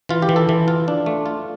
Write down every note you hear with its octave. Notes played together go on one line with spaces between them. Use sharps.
E3 F4
G4
E3
A4
E3
F4
D4
A3
F4